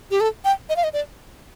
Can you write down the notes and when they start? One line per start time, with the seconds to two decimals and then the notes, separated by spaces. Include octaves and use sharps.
0.11 G4
0.20 A4
0.45 G5
0.69 D#5
0.76 F5
0.84 D#5
0.93 D5